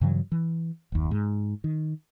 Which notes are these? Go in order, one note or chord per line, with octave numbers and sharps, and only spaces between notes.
G2 C#3 E3 F#3
E3
F#1 D#2
G#2
D#3